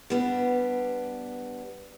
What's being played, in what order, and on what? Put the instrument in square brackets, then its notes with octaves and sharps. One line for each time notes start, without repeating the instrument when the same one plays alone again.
[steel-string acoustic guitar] G3 B3 D4